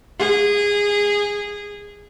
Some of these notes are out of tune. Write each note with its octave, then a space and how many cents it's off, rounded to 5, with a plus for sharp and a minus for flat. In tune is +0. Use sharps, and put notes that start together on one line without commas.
G#4 -20